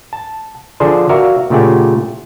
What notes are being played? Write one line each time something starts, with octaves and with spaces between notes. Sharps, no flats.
A5
D3 F3 D4 G#4 C5
F#4 A#4 D5 E5 F5
A#2 C#3 A3 G4 F#5 G#5